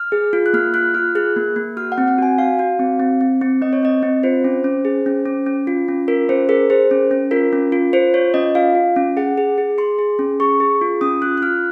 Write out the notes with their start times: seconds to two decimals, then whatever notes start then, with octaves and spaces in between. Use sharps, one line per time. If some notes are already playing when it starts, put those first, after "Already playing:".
Already playing: F6
0.12 G#4
0.33 F4
0.46 F#6
0.53 A#3 F6
0.74 F4 F#6
0.94 F4 F6
1.15 G#4 F#6
1.36 A#3
1.56 A#3
1.77 F#4 F6
1.92 F#5
1.98 C4
2.08 F#5
2.18 F#4 G#5
2.38 F#4 F5
2.59 F#4
2.79 C4
3.00 C4
3.21 C4
3.41 C4
3.62 C4 D#5
3.73 C#5
3.83 C4 D#5
4.03 C4
4.23 F4 C5
4.44 C#4
4.64 C#4
4.85 G#4
5.06 C#4
5.26 C#4
5.46 C#4
5.67 F4
5.88 C#4
6.08 F4 A#4
6.29 C#4 C5
6.49 G#4 A#4
6.70 G#4 C5
6.91 C#4
7.11 C#4
7.31 F4 A#4
7.53 C#4
7.72 F4
7.93 F4 C5
8.14 F4 C#5
8.34 C#4 D#5
8.55 F4 F5
8.75 F4
8.96 C#4
9.17 G#4 F#5
9.38 G#4
9.58 G#4
9.78 G#4 C6
9.99 G#4
10.19 C#4
10.40 G#4 C#6
10.60 G#4
10.82 F4
11.01 C#4 D#6
11.21 F4 F#6
11.37 F#6
11.42 F4 F6